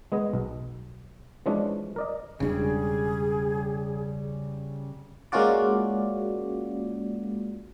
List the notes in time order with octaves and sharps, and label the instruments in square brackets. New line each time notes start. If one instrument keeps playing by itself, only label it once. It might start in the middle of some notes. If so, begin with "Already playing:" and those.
[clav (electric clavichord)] G#3 B3 G#4 D#5
B1
E3 F3 G#3 C#4 D4
A#4 D5 D#5
[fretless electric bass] E1 D4 [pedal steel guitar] C#3 G3 [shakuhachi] G#4
[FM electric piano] G#3 A#3 C#4 F4 F#4 D5